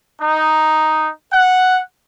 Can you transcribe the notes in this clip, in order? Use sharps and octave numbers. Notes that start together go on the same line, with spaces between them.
D#4
F#5